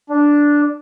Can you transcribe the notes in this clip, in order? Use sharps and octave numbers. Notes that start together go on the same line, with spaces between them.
D4